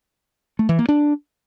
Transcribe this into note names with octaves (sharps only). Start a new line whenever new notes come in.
A3
E3
A#3
D4